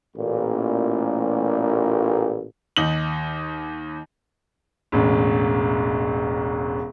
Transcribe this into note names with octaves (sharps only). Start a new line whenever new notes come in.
A1 A#2
D#2 D#4 F#7
E1 A1